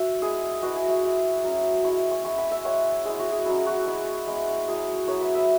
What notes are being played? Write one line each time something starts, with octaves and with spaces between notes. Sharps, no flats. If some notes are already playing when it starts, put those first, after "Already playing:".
Already playing: F#4 E5
G#3 B3 E4 G#4
G#3 E4 F#4 B4
G#4
E5 G#5
G#3 E4
F#3 C#4 E4
G#3 E4 G#5 C#6
G#5 C#6
G#3 B3 E4 G#5 C#6
F#5 B5
E5 G#5
G#3 E4 C#5 F#5
G#3 B3 E4 G#4
F#4
G#4
F#3 C#4 E4 G#4
F#4
G#3 B3 E4
G#3 B3 E4
F#3 E4 G#4
F#3 B3 E4 G#4 C#5
B4 E5
B4 E5